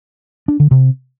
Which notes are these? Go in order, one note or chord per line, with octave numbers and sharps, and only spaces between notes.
D4
D3
C3